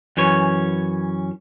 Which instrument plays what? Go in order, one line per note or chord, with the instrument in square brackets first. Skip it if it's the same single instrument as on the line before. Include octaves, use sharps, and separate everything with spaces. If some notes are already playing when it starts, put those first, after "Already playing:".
[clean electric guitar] F#2 E3 C#4 C#5